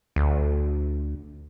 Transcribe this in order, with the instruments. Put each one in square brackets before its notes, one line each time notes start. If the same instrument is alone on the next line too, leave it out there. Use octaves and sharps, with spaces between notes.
[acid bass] D2